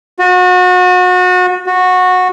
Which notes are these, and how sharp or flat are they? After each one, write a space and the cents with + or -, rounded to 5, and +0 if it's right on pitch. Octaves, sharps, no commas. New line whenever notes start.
F#4 -30
F#4 -15